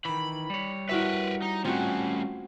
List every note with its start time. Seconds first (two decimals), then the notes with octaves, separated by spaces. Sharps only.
0.05 D#3 E3 B5
0.50 G3 C#5
0.89 E4 F#4 A#4 B4 E5
1.42 D#4
1.64 A3 C4 C#4 F4 F#4